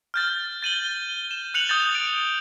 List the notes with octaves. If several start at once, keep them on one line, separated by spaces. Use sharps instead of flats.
F6 G6 A6
A6 D#7 F#7 G7
E7
F#6 C#7 F7 F#7
D#6 G6 A6 G7
D7